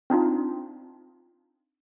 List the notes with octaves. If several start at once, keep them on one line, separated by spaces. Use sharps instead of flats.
C4 D4 D#4 F4